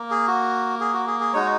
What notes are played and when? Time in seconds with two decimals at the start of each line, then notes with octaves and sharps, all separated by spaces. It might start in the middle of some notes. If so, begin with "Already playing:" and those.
Already playing: A#3
0.11 G#4
0.28 F#4
0.81 G#4
0.94 F#4
1.07 G#4
1.20 G#4
1.33 G#3 D#4 F#4 C#5